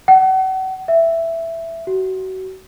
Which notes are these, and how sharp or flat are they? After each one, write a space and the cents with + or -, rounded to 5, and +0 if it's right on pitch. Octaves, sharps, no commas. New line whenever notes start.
F#5 +35
E5 +5
F#4 +30